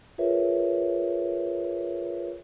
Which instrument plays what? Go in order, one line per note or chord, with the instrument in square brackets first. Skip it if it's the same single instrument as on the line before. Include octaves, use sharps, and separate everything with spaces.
[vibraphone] F4 G#4 A#4 B4 C#5 E5